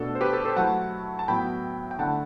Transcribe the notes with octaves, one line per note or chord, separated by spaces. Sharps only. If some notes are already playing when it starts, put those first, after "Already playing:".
Already playing: B2 A3 D4 A4
C5
G4 B4
A4
A4 C5
F#3 A3 E4 F#5 A5
A5
A2 F#3 B3 E4 G5 B5
G5
D3 A3 E4 F#5 A5